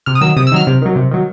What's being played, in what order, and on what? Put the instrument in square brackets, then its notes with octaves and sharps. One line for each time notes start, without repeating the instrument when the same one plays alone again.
[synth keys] C3 F6
D#6
D#3 F#3 E6
C3 D#6
E6
D#3 F#3 F6
C3
D#3 F#3
C3
D#3 F#3